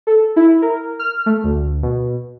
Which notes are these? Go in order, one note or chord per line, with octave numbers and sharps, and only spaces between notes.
A4
E4
A#4
F6
A3
D2
B2